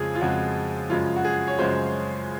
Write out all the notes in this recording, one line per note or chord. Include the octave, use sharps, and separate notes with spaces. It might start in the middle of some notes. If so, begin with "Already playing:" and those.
Already playing: F2 C#3 F3 G#3 F4 G#4
F4
F2 C#3 F3 G#3 F#4
F#2 C#3 F3 G#3 F4
F#4
G#4
C#5
F#2 C#3 F3 G#3 C5